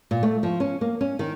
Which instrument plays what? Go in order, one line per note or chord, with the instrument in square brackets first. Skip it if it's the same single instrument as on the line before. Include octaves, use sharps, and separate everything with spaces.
[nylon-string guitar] A#2
A3
F3
C#4
A#3
C#4
D#3